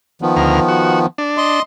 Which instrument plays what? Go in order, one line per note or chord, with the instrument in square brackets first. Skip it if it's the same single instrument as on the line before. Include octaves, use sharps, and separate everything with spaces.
[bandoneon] D#3 F3 B3
[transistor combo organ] D2 A#4
F#4
D4
[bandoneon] D#5 C6